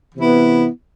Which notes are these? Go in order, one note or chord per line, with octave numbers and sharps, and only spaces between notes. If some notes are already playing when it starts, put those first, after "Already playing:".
C3 E3 B3 E4